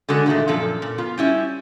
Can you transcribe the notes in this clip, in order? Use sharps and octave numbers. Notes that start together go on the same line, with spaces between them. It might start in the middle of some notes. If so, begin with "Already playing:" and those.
D3 G#3 F#4 A4
A#2 D#3 G#3 A3
F#2 A#2 F3 A4
A#2
B3 F4
G3 C#4 E4 G4